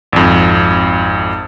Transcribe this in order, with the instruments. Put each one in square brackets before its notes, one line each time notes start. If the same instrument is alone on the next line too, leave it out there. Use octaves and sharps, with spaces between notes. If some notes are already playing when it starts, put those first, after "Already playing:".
[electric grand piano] G#1 F2